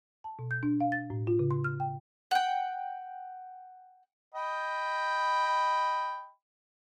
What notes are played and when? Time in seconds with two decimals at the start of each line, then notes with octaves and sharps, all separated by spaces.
0.24 A5
0.39 B2
0.51 G6
0.63 D4
0.81 F5
0.92 A6
1.10 A2
1.27 F4
1.39 C#3
1.51 C6
1.64 F6
1.80 G5
2.31 F#5 G5
4.35 D#5 G5 B5